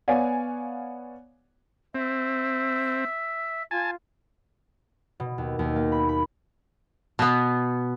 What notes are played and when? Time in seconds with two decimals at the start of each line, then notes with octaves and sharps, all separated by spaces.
0.08 B3 C#5 D5 F5 F#5 G#5
1.95 C4 E5
3.71 F4 G#5 A5
5.20 B2
5.38 D#2
5.59 D#2
5.76 A#3
5.92 B5
6.09 B5
7.19 B2 B3